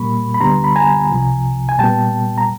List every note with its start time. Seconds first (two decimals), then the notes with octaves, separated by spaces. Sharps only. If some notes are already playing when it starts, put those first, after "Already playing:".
Already playing: A#2 G3 A#3 B5 C#6
0.34 B5
0.40 D2 D3 G3 B3 A#5 C6
0.64 B5
0.76 G#5 A#5
1.10 C2 C3 F3
1.69 G#5
1.79 A#2 G3 B3 G5 A5
2.38 A#5